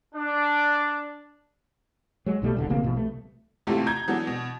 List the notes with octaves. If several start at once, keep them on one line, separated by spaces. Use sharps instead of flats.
D4
F#3 G#3
B1 B2 G3 A3
E1 E2 D3
A1 C#3 A#3 C4
G#1 B2 E3 F3
C2 A3
A1 C3 E3 A3 F4 G4
A#5 G6 G#6
E3 F#3 B3 D4
B2